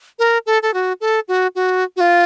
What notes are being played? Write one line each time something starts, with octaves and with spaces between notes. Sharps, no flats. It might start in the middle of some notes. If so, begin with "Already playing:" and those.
A#4
A4
A4
F#4
A4
F#4
F#4
F#4
F4